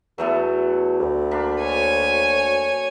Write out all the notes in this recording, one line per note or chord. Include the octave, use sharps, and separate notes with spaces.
E2 F#3 A3 B3
D2
A#3 D4 B5
C#5 G#5